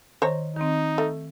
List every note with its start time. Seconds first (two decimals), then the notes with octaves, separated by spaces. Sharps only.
0.22 D#3 C5 C#5 A#5
0.57 D#3 C4 D#4
0.98 A3